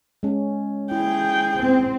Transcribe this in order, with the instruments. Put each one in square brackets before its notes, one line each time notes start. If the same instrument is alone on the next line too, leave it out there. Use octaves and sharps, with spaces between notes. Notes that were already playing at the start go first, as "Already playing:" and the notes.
[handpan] G#3 C#4
[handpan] E4 [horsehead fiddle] G#4 G5
[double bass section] C4